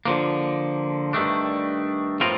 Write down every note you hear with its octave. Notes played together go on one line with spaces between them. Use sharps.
D3 F3 A#3
G2 D#3 A3 D4
A2 F3 C4 F4 A#4